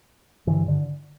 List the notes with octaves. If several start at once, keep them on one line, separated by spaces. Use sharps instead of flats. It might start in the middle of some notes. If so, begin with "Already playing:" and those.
G2 D3 E3
D3